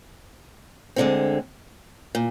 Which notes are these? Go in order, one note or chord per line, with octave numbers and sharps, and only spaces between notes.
D2 D3 G#3 C4
A#2